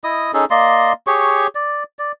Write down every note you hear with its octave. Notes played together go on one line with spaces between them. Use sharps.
E4 D#5 D#6
C#4 D#4 G#4 A4
A#3 D5 D#5 C6
G4 G#4 C#5 C#6
D5
D5